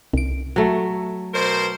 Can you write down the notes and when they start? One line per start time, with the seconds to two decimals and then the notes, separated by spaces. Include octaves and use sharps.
0.13 C2 D7
0.56 F#3 A3
1.33 B2 A#4 C5